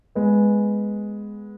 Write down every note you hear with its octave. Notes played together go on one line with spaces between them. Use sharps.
G#3 B3